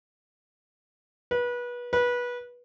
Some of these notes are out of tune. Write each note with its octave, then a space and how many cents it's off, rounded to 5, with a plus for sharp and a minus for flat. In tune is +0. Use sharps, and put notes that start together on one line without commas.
B4 -25
B4 -20